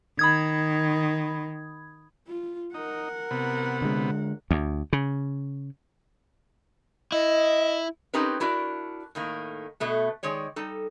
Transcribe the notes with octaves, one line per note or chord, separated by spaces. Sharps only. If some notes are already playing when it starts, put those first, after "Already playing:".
D#3 B5 D#6 G#6
F4
D#4 A#4 F#5
C3 B3
D3 G#3
D2
C#3
E4 D#5
C4 C#4 D#4 G4 A#4 B4
D4 E4 F#4 A#4 D5
A2 D#3 A#3
B2 A3 B3
D#3 G#3 C#5 D5
G3 D#4 A4